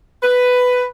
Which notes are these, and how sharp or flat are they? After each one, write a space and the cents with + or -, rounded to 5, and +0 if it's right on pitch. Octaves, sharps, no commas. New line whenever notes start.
B4 +10